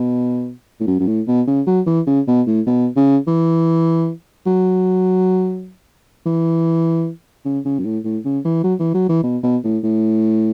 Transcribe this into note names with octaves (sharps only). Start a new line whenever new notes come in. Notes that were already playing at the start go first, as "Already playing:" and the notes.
Already playing: B2
A2
F#2
F#2
A2
B2
C#3
F#3
E3
C#3
B2
A2
B2
C#3
E3
F#3
E3
C#3
C#3
F#2
A2
A2
C#3
E3
F#3
E3
F#3
E3
B2
B2
A2
A2